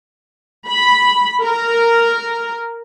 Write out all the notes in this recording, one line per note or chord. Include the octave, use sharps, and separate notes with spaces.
B5
A#4